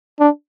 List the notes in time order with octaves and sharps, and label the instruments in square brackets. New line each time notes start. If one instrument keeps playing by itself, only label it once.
[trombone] D4